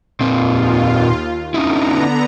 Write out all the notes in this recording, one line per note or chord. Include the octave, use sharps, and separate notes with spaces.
D#2 A#2 A#3 C4 F4
D3 B3 C#4 D#4 E4 A#5